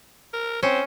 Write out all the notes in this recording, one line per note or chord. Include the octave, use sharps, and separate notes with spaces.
A#4
C4 C#4